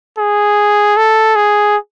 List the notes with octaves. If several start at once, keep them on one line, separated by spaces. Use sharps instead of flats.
G#4
A4
G#4